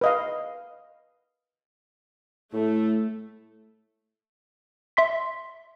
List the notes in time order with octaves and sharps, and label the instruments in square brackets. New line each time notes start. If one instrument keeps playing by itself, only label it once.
[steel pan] B4 D#5 F5
[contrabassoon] A2 [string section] A3
[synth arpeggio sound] E5 C6 B6